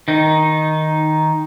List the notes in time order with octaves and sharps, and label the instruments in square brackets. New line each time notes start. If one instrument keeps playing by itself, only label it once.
[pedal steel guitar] D#3 D#4